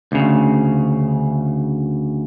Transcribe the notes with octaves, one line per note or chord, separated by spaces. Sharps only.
D2 C#3